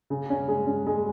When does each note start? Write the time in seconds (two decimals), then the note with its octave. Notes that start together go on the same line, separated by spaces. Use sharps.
0.10 C#3
0.30 C#4
0.48 G#3
0.67 C#4
0.87 G#3